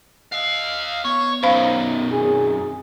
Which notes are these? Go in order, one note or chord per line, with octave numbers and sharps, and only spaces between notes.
D#5 F5
B3 C#5
F#2 D#3 C5 F5 B5
C4 G#4